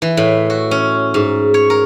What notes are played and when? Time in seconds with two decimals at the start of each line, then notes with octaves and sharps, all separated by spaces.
0.02 E3
0.17 A2
0.50 F#4
0.71 C#4
1.14 G#2
1.54 C#5
1.70 A#4